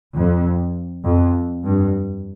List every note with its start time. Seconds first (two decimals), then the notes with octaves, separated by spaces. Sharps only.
0.15 F2
1.04 F2
1.64 G2